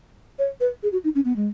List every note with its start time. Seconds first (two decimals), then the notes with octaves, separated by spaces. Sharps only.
0.39 C#5
0.61 B4
0.83 G#4
0.92 F#4
1.04 D#4
1.15 C#4
1.25 B3
1.36 G#3